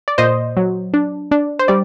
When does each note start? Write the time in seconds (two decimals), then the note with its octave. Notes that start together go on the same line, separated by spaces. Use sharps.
0.08 D5
0.18 A#2 C5 D#5
0.57 F#3
0.94 D4
1.31 D4
1.59 C5
1.68 G3 D5